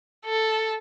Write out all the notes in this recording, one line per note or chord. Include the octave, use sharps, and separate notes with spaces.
A4